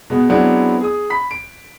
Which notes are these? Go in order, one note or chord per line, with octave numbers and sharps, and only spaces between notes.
B2 G#3 B3
F#3 G#3 B3 C4 D4 E4
G#4 D#6
B5 B6
D7